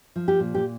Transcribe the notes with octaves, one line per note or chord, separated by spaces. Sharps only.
F3
G4
A#2
G4